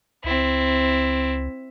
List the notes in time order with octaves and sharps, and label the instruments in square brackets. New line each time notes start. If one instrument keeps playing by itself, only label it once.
[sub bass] C#2 [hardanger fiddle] C4 E4